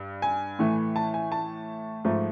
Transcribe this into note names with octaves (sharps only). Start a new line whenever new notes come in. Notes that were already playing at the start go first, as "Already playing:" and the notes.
Already playing: G2
G#5
A2 E3 A3
A5
G#5
A5
G#2 F3 A3